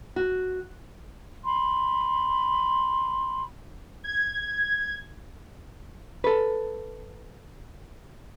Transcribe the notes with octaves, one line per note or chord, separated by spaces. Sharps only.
F#4
B5 C6
G#6
A4 B4